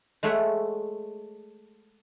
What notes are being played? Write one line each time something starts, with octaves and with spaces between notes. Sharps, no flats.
G#3 A3 G#4 C#5 E5 F#5